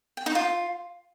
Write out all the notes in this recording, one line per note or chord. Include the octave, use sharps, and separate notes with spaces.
G5
D#4
F4